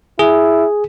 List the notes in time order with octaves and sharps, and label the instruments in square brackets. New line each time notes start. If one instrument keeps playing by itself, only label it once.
[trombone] E4 [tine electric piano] G#4